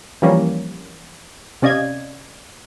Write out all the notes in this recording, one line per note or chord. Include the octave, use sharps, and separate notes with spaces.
E3 F3 G3 A#3 C#4
C3 C#4 D5 D#5 F5 G#6